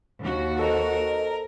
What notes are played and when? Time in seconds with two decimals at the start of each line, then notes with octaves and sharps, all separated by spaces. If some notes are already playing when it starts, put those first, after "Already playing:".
0.20 D#2 F#4
0.59 A4 A#4 C5 D#5